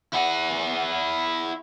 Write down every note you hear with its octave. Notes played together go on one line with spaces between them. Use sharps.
E4 F#5